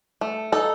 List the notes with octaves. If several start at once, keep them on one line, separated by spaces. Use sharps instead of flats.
A3
D#4 A4